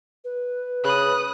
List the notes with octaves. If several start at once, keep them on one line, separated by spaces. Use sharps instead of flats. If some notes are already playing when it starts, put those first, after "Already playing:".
B4
C#3 B5 D#6 F#6